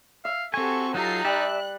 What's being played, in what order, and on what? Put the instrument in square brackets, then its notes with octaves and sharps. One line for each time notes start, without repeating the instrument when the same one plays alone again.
[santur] E5 [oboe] F5
[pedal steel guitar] C4 G#5 [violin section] F#4 G4 A4 [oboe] C#6
[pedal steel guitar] F#3 F4 A4 [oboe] D#4 [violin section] G4 A#5 C7
[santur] G3 [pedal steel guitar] D5 E5 A5 [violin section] F#6